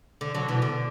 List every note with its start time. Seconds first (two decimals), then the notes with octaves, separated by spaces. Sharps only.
0.21 D3
0.35 D3 F#3
0.48 B2 E3
0.62 D3